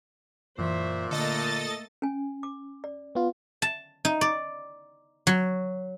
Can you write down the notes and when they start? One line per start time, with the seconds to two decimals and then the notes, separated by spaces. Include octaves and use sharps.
0.58 F#2 A#2 E3 C5 E5 C#6
1.11 D3 A3 A#3 A4 D#5 A6
2.02 C#4 G#5
2.43 D6
2.84 D5
3.15 B3 F4
3.62 A5
4.05 D#4
4.21 D5
5.27 F#3